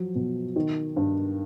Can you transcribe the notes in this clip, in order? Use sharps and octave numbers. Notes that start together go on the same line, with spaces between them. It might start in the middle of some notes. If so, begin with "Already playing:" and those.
Already playing: F3 F#3
B2
D#3
G2